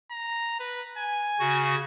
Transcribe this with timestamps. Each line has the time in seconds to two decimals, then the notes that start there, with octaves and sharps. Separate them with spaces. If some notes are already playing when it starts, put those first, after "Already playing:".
0.11 A#5
0.60 B4
0.97 G#5
1.40 C#3 F#4